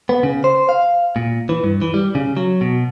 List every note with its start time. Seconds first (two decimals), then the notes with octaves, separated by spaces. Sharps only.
0.09 B3
0.23 C#3
0.44 C5
0.69 F5
1.16 A#2
1.49 E3
1.63 G2
1.82 E3
1.94 G3
2.15 C#3
2.37 F#3
2.61 B2